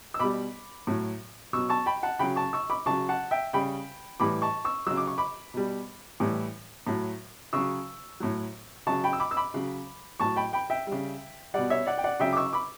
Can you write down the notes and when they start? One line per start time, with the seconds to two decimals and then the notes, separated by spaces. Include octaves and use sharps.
0.14 E6
0.19 B2 G3 B5 D6
0.87 A2 F#3
1.53 B2 F#3 C#6 E6
1.69 A5 C#6
1.86 G5 B5
2.03 F#5 A5
2.19 C#3 F#3 G5 B5
2.36 A5 C#6
2.53 C#6 E6
2.70 B5 D6
2.86 C#3 F#3 A5 C#6
3.09 F#5 A5
3.31 E5 G5
3.53 C#3 G3 G5 B5
4.20 A2 E3 G3 B5 D6
4.42 A5 C#6
4.65 C#6 E6
4.87 C#3 F#3 E6
4.97 D6
5.07 C#6
5.18 B5 D6
5.54 B2 G3
6.20 A2 E3 G3
6.87 A2 F#3
7.53 C#3 F#3 C#6 E6
8.20 A2 F#3
8.87 C#3 F#3 A5 C#6
9.04 G5 B5
9.13 E6
9.20 B5 D6
9.31 E6
9.37 B5 D6
9.54 C#3 F#3
10.20 A2 F#3 A5 C#6
10.36 G5 B5
10.53 G5 B5
10.70 E5 G5
10.87 C#3 G3
11.54 B2 G3 D5 F#5
11.70 C#5 E5
11.86 D5 F#5
11.98 G5
12.04 D5 F#5
12.20 C#3 F#3 E5 G5
12.33 D6
12.37 C#6 E6
12.53 B5 D6